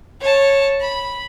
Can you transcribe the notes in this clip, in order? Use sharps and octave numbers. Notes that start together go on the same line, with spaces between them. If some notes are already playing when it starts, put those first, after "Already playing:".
C#5 A5
B5